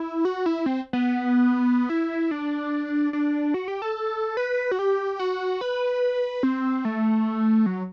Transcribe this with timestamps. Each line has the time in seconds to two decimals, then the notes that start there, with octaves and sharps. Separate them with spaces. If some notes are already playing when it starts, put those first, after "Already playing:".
Already playing: E4
0.25 F#4
0.46 E4
0.66 C4
0.93 B3
1.89 E4
2.31 D4
3.13 D4
3.54 F#4
3.68 G4
3.82 A4
4.37 B4
4.71 F#4
4.79 G4
5.19 F#4
5.61 B4
6.43 C4
6.85 A3
7.66 F#3